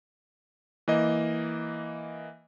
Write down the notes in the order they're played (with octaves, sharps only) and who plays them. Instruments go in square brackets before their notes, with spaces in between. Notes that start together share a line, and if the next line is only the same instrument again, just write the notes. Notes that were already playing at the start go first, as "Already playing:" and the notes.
[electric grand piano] E3 A#3 D#5